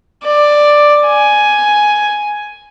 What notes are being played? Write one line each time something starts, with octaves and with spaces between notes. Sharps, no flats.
D5
G#5